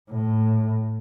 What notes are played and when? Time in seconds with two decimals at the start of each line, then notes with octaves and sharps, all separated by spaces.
0.11 A2